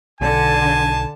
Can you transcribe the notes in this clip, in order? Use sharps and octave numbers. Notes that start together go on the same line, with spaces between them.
B1 D3 G#5 A5